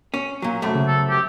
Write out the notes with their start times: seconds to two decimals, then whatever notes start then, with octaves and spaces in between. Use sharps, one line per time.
0.14 C#4
0.42 A#2 F#3
0.62 C2 F#2 A3
0.75 C#3
0.88 A4
1.09 G4